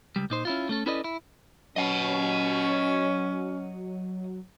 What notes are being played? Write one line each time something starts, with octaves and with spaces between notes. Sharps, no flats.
C#2 G3
A#2 D#4 C5
C#4 E4 F4
A3 C#4 A4
C#4 E4 A4 B4 D5 D#5
E4
F#3 C#4 D#5 F#5